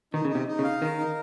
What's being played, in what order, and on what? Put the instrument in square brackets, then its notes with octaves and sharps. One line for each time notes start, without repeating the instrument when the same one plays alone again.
[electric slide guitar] D#3 [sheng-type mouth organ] D#4
[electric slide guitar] C#3
[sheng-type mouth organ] D#4
[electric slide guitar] C3
[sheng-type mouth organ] D#4
[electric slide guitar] C#3
[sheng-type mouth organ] F5
[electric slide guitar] D#3 [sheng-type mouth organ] A#4
[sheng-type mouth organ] D#4